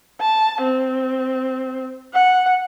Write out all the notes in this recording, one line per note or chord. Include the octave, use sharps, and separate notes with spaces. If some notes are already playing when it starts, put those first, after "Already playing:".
A5
C4
F#5